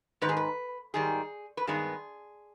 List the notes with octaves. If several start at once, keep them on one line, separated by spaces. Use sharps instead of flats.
G#2 D#3 B4
G#4
B4
G#2 D#3 G3 G#4
B4
G2 D#3 G#3 B3 G#4